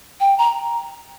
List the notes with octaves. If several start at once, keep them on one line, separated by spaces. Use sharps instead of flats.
G5
A#5